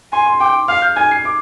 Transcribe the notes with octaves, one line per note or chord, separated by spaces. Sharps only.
G#5 C6
C6
G5 D6
F5 F6
G6
G#5 G#6
C7
D6